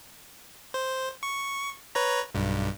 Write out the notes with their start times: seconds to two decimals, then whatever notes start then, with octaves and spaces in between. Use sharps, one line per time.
0.74 C5
1.23 C#6
1.95 B4 C#5 A#5
2.35 B1 G2